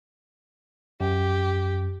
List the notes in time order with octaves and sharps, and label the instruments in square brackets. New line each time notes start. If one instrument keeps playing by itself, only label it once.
[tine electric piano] F#2 [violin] G4